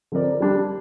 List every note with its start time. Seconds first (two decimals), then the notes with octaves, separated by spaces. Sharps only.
0.12 D3 F3 C4 A#4 D5
0.40 G3 D4 G4